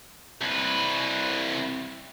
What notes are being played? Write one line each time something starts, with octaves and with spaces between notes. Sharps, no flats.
C2 B4